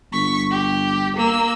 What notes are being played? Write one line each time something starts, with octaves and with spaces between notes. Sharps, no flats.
G1 C#6 B6
G4
A#3 E6